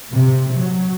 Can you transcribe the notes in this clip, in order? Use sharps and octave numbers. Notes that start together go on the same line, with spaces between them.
C3
F#3